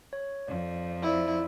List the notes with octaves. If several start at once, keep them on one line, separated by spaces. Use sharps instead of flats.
C#5
F2 D5
E4 C5 D5